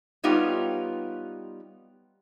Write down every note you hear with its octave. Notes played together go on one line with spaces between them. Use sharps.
G3 B3 D#4 F4 G4 C#5